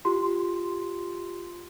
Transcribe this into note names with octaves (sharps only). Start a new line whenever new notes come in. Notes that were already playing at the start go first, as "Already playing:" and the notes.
F4 G4 C6